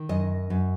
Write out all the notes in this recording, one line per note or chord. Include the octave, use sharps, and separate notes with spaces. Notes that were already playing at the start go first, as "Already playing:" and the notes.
Already playing: D#3
F#2 D#5
F#2